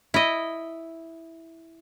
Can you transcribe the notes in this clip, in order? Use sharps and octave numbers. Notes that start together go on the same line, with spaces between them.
E4 D#5